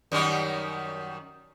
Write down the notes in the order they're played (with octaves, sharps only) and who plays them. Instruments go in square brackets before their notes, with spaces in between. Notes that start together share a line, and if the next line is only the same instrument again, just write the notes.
[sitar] F#2 D#3 G3